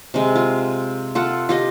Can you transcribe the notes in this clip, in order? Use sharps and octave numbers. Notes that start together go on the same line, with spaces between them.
C3 G#3
F4
F4 A4 F#5
F4 G4 D#5